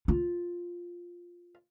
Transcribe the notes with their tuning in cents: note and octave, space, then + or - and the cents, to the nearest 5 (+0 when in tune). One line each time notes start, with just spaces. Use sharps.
F4 +5